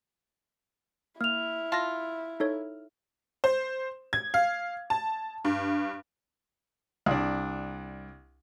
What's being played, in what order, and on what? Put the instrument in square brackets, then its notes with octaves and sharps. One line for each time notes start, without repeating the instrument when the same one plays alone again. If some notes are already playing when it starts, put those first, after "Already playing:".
[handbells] A#3 [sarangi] E4 [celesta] F6 F7
[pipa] F4 [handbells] A5 A#6
[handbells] D#4 A4 C#5
[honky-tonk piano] C5
G#6
F5
A5
G2
[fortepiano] C2 D4